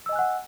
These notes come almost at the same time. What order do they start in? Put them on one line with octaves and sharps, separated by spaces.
E6 D#5 G#5 F#6 F#5